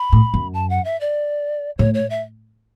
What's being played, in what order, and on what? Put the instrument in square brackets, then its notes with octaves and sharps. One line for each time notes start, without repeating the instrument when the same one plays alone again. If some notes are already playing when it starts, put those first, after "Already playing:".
Already playing: [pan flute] B5
[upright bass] A2
F#2
[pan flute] A5
F#5
E5
D5
[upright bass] A2 [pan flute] C#5
[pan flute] C#5
E5